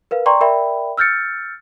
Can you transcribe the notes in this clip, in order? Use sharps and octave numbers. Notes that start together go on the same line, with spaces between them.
A#4 B4 F5
D5 G5 A#5 C6 C#6
A#4 D5 E5 G5 B5
E6 F6 G6 A6 C#7